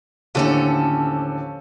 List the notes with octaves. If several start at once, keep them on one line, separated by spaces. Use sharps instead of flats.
D#2 A2 D3 F3 C#4 A4